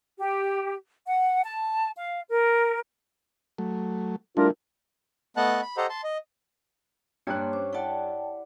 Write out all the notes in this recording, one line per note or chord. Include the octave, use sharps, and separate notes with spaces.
G4
F#5
A5
F5
A#4
F#3 A3
G3 A3 D4 E4 F4 A#4
A3 B3 D#5 F#5 A5 F#6
B5
G4 A4 C5 D#5 F#5 A#5
A5 C6
D#5
G2 A#3 D4 G4 C#5 C6 F#6
C#4 C5 D6
E4 D5 F#5 G5 A5